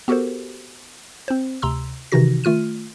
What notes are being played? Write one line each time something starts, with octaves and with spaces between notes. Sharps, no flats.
B3 F#4 G4 A4 A#4 C5
C4 C5
D2 C3 A#5 C6 E6
C3 D#3 E3 D#4 F#4 A#6
D#3 A3 F4 F6 D#7